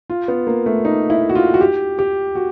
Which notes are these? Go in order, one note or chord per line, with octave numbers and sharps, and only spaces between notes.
F4
B3
A#3
A3
D#4
E4
F#4
F4
F#4
G4
G4
F#4